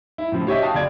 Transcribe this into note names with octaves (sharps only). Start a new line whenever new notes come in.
E4
A2 C#3 F3
G4 C#5 D#5 E5
F#4 F5 G5 A5 D#6
F#1 D5 G#6